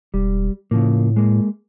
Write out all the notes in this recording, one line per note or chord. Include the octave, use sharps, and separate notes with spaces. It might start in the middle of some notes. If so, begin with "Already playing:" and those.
E1 G3
A2 C#3 F3 A#3
G#3 A#3